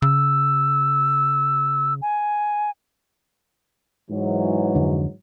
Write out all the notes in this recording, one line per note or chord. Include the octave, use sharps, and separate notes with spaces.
C#3 E6
G#5
G#2 E3 F#3
F2 D3 D4